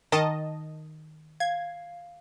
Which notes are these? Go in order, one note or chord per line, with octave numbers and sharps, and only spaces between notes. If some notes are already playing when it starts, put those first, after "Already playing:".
D#3 A#4 D#5 A5
F5 G#6